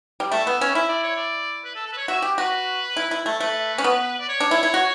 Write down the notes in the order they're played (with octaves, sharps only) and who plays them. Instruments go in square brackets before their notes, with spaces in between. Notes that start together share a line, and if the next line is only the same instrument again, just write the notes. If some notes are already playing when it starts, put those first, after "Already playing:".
[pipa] G3
[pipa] A3 [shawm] E5
[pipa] B3
C#4
[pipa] E4 [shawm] E5
[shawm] D5
C#5
D5
B4
A4
A4
B4
C#5
[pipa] F#4 [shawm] E5
[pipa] G4
[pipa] F#4 [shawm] B4
[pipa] E4
E4
A3
[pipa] A3 [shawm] B4
[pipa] C#4
B3
[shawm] D5
C#5
[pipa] D4
E4
E4
F#4